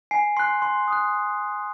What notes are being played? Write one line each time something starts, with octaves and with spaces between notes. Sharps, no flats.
G#5 C7
C6 F#6 C7
C6
D#6 F#6